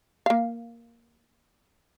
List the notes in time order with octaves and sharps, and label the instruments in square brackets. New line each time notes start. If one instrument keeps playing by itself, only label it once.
[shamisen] A#3 F5